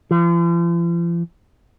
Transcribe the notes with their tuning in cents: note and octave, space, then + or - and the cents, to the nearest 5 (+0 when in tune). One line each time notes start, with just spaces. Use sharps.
F3 -45